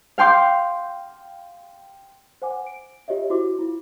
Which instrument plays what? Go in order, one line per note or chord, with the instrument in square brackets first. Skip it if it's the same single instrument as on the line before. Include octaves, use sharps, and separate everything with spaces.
[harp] F5 G5 C6 D6 G6
[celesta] C5 F#5 G#5 D6
D7
F4 G4 C#5 D#5 E5
E4 F#4 C5 D6
E4 F4